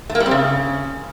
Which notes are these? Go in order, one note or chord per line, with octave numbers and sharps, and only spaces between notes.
A3
A#3
G3
C4
C#3